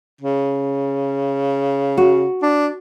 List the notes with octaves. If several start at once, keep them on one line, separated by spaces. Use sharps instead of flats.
C#3
F#4
D4